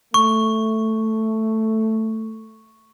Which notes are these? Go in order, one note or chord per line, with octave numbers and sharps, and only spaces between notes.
A3 C#6